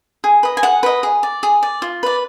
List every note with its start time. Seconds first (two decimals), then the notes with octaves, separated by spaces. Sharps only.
0.24 G#4
0.43 B4 D#5
0.57 G#5
0.63 G#4 F#5
0.83 B4 D#5
1.03 G#4
1.23 D5
1.43 G#4
1.63 D5
1.82 F4
2.03 B4 D5